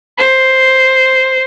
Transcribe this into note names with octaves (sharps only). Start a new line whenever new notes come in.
C5